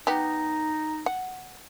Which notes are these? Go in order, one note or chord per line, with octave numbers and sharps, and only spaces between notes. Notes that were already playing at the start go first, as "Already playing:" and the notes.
B3 D#4 G4
F#5